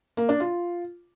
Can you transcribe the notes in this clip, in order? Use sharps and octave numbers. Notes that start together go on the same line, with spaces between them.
A#3
D4
F4